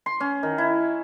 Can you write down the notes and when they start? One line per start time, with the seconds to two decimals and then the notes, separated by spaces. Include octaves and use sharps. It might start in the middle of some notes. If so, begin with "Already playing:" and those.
0.06 C6
0.20 C#4
0.43 D#3
0.58 E4